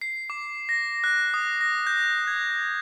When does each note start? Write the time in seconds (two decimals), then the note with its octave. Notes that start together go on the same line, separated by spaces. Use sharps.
0.01 C7
0.30 D6
0.69 A#6
1.04 F#6
1.34 D#6
1.61 A#6
1.87 G6
2.27 G#6